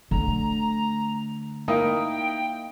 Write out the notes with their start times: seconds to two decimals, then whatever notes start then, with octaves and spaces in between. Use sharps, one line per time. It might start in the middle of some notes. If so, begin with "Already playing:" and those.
0.11 D3 A3 A#5
1.68 A#3 D#4 E4 G5 D#6